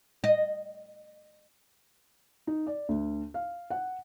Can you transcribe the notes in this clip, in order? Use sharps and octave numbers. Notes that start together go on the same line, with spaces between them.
D#5
D#4
D5
D2
F5
F#5